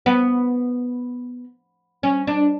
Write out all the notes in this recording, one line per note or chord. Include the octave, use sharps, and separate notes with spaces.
B3
C#4
D4